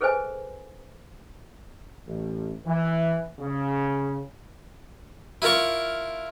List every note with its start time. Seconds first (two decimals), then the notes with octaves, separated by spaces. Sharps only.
0.01 G#4 A4 B4 C5 D#5 G#5
2.06 A1
2.66 E3
3.40 C#3
5.42 E4 F4 A#4 A#5 C#6